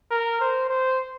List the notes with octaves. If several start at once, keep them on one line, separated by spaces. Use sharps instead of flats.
A#4
C5
C5